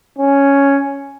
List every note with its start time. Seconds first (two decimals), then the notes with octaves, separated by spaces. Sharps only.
0.19 C#4